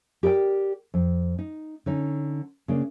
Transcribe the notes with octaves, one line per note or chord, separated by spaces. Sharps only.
G4 A#4 D5 G5
F2
D#4
D3 C#4 D#4
C#3 A#3 D4